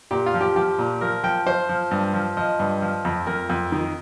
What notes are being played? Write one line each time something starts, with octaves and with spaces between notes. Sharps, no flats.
A#2 G4
F4
F3
G4
F3 G4
A#2
F3 A#4
F3 G5
F3 C5
F3
G2
F3
F3 D#5
G2
F3
F2
F2 A#4
F2
D#3